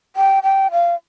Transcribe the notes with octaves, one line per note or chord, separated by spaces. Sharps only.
G5
G5
F5